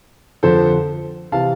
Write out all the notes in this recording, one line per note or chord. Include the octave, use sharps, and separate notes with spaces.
F2 D3 F3 A4 C5
C3 E3 F5 A5